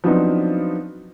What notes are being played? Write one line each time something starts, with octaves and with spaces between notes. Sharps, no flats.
F3 F#3 B3 C4 D4 D#4